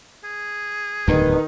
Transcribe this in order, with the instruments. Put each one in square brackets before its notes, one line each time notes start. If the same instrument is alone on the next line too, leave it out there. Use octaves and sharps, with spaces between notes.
[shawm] G#4
[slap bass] D1 E2 G2 [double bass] D#3 D#4 [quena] B4